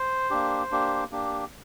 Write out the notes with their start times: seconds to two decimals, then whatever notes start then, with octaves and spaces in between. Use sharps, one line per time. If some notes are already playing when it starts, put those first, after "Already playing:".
Already playing: C5
0.30 A#3 D4 G4
0.72 A#3 D4 G4
1.11 A#3 D4 G4